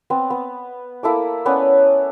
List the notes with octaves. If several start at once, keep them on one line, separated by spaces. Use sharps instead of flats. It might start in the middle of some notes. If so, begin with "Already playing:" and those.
B3 C4
B3
A#3 E4 A4 D6
B3 C#4 D5 F#5